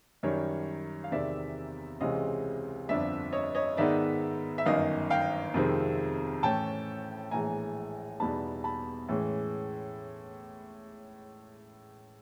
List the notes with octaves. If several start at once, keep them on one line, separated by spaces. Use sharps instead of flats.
F#2 D#3 G3 C#5
F5
E2 C3 D#3 D5 E5
C#2 C3 E3 G#3 C#4 D#5 F5
G1 F2 D3 D5 E5
C#5 D#5
C#5 D#5
G#2 D#3 G#3 B3 D#4 D5 E5
E5
G1 F#2 D#3 D#5 F5
F5 G5
F2 C3 D#3 G#3 C4
A2 E3 A3 C#4 G5 A5
A#1 A2 E3 G#3 G#5 A#5
E2 B2 G3 B3 D#4 A5 B5
A5 B5
A2 E3 G#3 C#4